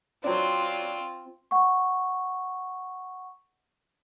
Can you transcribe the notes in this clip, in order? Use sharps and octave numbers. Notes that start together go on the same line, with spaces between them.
F#3 C4 D4 F4
F#5 C#6